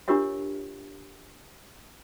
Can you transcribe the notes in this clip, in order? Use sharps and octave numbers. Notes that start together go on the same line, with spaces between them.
D4 F4 G4 A#4 C#5 E5